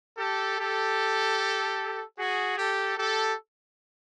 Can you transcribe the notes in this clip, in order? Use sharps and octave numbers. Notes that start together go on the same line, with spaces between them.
G4 A4
G4 A4
F#4 G#4
G4 A4
G4 A4